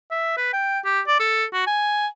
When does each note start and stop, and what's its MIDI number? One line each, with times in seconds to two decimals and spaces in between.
0.11 0.35 76
0.37 0.52 71
0.53 0.79 79
0.85 1.00 67
1.07 1.16 74
1.20 1.44 69
1.53 1.63 66
1.67 2.07 80